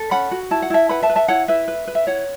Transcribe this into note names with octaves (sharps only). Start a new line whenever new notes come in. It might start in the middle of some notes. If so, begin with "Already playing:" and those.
Already playing: A4
C#4 F#5 B5
F#4
E4 A5
F#5
E4 E5 A5
B4 F#5 B5
E5 A5
B4
E5 A5
E4 C#5 F#5
E4 B4 E5
B4
B4
E5
E4 C#5 F#5